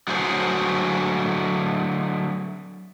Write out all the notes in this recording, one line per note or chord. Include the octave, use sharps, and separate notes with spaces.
D3 F#3 A3 G#4 C5 C#5